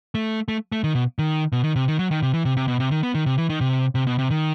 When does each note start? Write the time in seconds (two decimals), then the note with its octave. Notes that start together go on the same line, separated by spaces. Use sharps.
0.15 A3
0.48 A3
0.72 A3
0.84 D#3
0.95 B2
1.19 D#3
1.52 B2
1.64 D#3
1.76 C3
1.88 D#3
1.99 F#3
2.11 D#3
2.22 C3
2.34 E3
2.45 C3
2.57 C3
2.68 B2
2.80 C3
2.91 D#3
3.03 B3
3.15 D#3
3.26 C3
3.38 E3
3.50 D#3
3.61 C3
3.95 C3
4.07 B2
4.19 C3
4.30 D#3